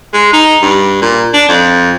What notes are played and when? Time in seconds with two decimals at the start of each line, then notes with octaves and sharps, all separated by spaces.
0.14 G#3
0.33 D#4
0.62 G2
1.02 A#2
1.34 D4
1.49 F2